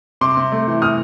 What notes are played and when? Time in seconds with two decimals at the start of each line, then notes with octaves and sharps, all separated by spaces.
0.21 C3 C6 D6
0.37 C3
0.52 A3
0.68 E3
0.82 C3 D#6 F6